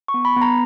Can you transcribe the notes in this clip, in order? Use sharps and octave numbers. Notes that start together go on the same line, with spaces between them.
C#6
B3
B5
B3
A#5